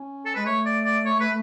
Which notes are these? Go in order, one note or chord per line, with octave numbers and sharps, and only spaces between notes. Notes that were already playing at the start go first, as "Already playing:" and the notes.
Already playing: C#4
A4
G#3 B4
A3 C#5
D5
D5
C#5
B4